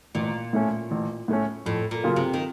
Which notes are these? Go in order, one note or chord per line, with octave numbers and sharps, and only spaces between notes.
A1 A#2
A2 A3 C#4
A1
A2 A3 C#4
F2 A2
A#2
C#3 F#3 A#3 F4
C3
D#3